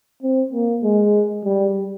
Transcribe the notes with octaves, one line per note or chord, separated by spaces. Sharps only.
C4
A#3
G#3
G3